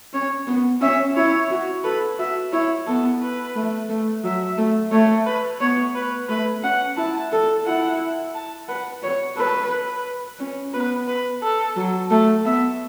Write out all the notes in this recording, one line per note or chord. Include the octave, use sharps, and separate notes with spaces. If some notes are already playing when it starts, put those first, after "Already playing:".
C#4 C#5
B3
C#4 E5
E4 C#5
F#4
A4 B4
F#4 E5
E4 C#5
B3 A4
B4
A3
A3
F#3 E5
A3
A3 C#5
B4
B3 C#5
B4
A3 B4
C#4 F#5
E4 A5
A4
E4 F#5
A5
B4 F#5
C#5
A4 B4
B4
C#4
B3 B4
B4
A4
F#3
A3 A4
B3 E5